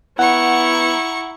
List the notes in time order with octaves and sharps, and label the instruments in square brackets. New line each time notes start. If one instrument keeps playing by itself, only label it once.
[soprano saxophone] B3 [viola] E4 [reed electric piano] F#5 [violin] A#5 C#6